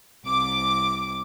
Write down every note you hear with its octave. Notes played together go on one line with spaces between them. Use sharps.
C2 D6